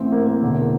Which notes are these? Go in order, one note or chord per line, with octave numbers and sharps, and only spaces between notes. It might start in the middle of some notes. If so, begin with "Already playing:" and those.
Already playing: A1 A2 E3 C4
A#3
A#3
E1 E2 D3